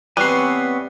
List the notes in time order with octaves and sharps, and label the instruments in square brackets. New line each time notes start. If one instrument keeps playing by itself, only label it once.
[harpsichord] E3 C4 [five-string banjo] G3 [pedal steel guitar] B3 C#5 G#5 [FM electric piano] F#6 C7